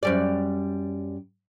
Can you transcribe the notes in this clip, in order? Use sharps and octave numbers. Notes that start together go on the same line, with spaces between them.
F#2 G3 D5